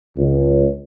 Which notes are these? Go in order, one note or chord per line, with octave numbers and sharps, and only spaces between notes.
C#2